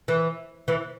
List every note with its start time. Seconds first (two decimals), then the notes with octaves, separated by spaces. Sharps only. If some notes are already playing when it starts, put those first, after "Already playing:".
0.08 E3
0.68 E3